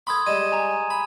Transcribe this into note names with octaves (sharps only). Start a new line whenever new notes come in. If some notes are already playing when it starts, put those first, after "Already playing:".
A4 G5 B5 C6 D#6 G#6
G3 G#3 D#7 E7
G#5 A#5
B5